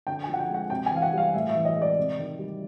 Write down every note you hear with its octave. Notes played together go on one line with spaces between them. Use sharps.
D3 G5
G#5
F3
F#5
G5
G#3 F#5
C3 G5
G#5
E3
F5
F#5
G3 F5
A2 E5
E5
E3
D#5
G#3
D5
C3
D#3
G3